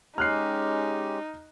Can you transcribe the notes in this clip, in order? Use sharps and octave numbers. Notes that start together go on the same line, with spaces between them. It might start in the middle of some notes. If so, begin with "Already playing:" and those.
G#3 C#4 D#4 G4 F6 F#6 C7